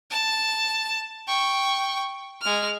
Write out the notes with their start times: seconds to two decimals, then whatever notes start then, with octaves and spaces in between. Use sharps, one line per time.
0.10 A5
1.27 G5 C#6
2.41 G#3 F6